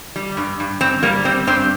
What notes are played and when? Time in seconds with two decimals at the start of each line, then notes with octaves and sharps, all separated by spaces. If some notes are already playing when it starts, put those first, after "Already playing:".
0.16 G3
0.37 G2
0.60 G2
0.81 G2 C4
1.03 G3 A#3
1.25 G3 C4
1.47 G2 C4